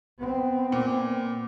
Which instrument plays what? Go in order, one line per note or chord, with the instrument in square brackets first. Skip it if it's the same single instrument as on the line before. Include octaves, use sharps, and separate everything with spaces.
[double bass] B3 C4
[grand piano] A#2